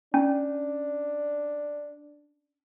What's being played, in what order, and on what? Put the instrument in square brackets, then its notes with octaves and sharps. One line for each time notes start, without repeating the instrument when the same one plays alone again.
[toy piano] C#4 [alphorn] D4